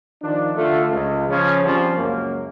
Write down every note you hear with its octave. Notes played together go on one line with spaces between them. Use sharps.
D#3 F3 D4
D3 A3 F4 A4
C#2
C#3 F3 C#4
F3 G3 C4 C#4
C#2 F#2 A#3